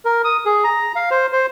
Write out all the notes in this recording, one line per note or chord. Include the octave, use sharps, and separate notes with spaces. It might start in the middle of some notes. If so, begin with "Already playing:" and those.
A#4
D#6
G#4
A#5
F5
C5
C5